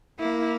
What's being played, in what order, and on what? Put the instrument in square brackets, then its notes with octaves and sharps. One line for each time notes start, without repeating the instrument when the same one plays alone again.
[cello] A#3 [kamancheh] E4